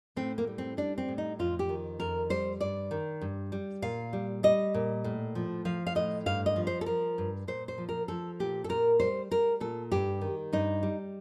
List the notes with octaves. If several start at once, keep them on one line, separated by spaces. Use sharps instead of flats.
A2 C4
A#3
G3
C4
G3 D4
C4
A2
D#4
F2 F4
G4
D#3
F2 A#4
G3 C5
G2 D5
D#3
G2
G3
A#2 F5
G3
G3 D#5
A#2
A2
F3
F3 F5
F5
A2 D#5
G2 F5
D#5
F3
C5
A4
F3 A#4
G2
A#2 C5
C5
F3
A#4
F3 A4
A#2 G4
A4
A#2 A#4
G3 C5
G3 A#4
A#2 A4
G2 G4
D#3
G2 D#4
G3